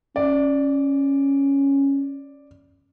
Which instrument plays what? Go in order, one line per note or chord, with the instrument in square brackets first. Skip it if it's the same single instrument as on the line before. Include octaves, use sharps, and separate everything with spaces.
[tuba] C#4 [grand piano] D5